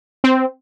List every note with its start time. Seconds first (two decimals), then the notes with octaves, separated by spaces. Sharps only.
0.24 C4